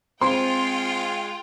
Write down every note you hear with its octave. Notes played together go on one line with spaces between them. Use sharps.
G#3 C4 F4 G5 C6